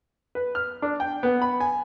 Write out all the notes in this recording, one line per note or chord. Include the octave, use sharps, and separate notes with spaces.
B4
F6
D4
G5
B3
B5
G#5